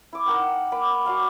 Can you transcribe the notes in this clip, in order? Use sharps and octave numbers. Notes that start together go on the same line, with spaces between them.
E4 D6
D#4 A#4 F#5 G5
A#3 B5 D6
F#4 D5 F5 A5